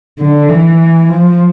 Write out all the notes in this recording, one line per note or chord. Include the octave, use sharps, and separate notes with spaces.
D3
E3
F3